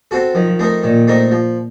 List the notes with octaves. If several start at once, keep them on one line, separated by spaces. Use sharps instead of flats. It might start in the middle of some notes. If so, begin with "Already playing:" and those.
C4 F#4 A4
D#3 F3
A3 C4 D#4 A#4
A#2 D#3
A3 C4 D#4 A#4
F3